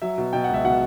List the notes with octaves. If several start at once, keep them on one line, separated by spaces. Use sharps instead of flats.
F#3 E5
B2
B2 G5
F#5
C#2 E5
B2 F#5